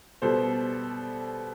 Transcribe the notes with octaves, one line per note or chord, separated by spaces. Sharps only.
B2 G3 A4 C5